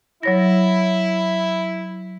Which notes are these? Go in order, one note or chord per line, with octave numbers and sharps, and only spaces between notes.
F#3 E4 C#5 A#6